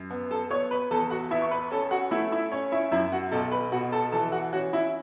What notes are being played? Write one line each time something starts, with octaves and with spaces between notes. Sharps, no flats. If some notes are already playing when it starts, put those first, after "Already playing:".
Already playing: F#2
B3
A4 A5
B3 C#5 C#6
B4 B5
E2 A4 A5
F#4 F#5
B3 E4 E5
C#6
B4 B5
C#4 A4 A5
F#4 F#5
A3 E4 E5
E4 E5
C#4 C#5
E4 E5
F#2 E4 E5
F#4 F#5
B1 A4 A5
B4 B5
B2 F#4 F#5
A4 A5
E3 A4 A5
F#4 F#5
C#4 F#4 F#5
E4 E5